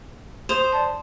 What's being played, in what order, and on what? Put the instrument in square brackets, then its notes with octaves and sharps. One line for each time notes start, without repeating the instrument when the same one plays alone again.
[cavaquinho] C5 [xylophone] D#6 F7
[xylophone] D5 A5